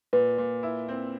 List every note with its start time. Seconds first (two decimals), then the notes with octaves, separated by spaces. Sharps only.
0.13 A#2 B4
0.38 A#2
0.63 E4
0.88 C4